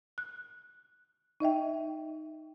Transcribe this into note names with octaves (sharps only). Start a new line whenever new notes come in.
F#6
D#4 D#5 E5 G5